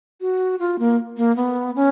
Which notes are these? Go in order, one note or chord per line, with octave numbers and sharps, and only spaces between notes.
F#4
F4
A#3
A#3
B3
C#4